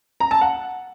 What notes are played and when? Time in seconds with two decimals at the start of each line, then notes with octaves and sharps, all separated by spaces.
0.20 A#5
0.31 A5
0.41 F#5